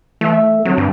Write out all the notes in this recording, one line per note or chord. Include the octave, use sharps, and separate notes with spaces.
E3 A3 E5
E5
D3 F#3 C4
G2